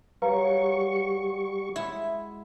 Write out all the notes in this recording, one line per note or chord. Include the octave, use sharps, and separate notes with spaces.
F#3 G3 G#4 B4 F5 A#5 C#6
G#3 E4